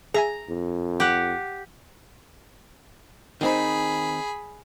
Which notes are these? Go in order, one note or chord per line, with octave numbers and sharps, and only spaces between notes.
G#4 E5 G#5 A#5
F2
G4 F#5
D#3 C4 D#4 G#4 B5